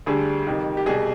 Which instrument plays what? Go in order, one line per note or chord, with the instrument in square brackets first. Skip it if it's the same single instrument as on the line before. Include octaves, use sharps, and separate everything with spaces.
[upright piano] D2 D3 G3 G#4
F2 C3 D#3 G3
G4
C2 B2 G3 G#4